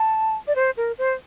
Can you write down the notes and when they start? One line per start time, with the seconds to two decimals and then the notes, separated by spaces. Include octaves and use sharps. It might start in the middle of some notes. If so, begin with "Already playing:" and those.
Already playing: A5
0.48 D5
0.56 C5
0.77 A#4
0.98 C5